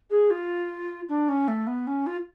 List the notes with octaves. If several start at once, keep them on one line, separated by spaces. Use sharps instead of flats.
G#4
F4
D4
C#4
A3
B3
C#4
F4